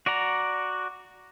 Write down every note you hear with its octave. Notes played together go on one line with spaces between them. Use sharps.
F#4 D5 F#5 A#5